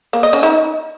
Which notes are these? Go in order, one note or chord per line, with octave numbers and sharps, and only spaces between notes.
A#3
D#5
C#4
D#4